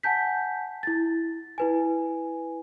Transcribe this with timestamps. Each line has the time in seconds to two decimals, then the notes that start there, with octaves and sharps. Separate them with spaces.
0.03 F#5 G#5 A5 G6 B6
0.83 E4 A6
1.58 E4 B4 G#5